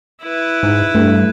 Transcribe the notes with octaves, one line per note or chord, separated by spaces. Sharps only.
E4 B4
G#2
G2 A3 A4